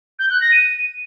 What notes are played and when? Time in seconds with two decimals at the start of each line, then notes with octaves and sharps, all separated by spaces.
0.19 G6
0.30 F#6
0.41 A#6
0.52 D#7